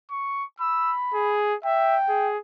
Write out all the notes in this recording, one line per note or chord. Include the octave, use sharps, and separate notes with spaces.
C#6
B5 E6
G#4
E5 G5
G#4